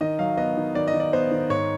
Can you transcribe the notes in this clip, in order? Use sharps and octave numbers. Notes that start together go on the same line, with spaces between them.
D#3 D#5
F#3 F5
B3 D#5
D#3
D#3 D5
D#5
D#3
D5
B3 C5
D#3
G#2 C#5